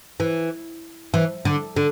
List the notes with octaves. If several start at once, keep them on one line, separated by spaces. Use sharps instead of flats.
E3
E3
D3
D3